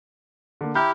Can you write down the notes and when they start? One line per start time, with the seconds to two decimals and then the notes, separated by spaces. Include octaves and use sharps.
0.61 D3 A#3
0.75 E4 G4 A#5 F6 G6